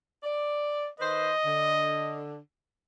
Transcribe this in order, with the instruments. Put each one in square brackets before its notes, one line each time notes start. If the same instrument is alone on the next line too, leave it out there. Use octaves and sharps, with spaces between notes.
[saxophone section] D5
[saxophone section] D#3 B4 C5 [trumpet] D#5
[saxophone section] D3